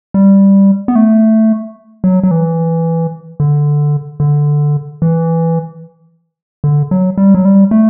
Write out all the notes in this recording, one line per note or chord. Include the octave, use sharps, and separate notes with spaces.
G3
B3
A3
F#3
F#3
E3
D3
D3
E3
D3
F#3
G3
F#3
G3
A3